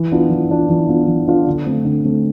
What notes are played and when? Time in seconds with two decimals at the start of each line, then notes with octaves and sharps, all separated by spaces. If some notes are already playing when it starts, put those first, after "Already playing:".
Already playing: E3
0.12 B3 D4 F4
0.30 E3
0.50 B3 D4 F4
0.70 E3
0.88 B3 D4 F4
1.07 E3
1.28 B3 D4 F4
1.46 D3
1.66 A3 C4
1.85 D3
2.05 A3 C4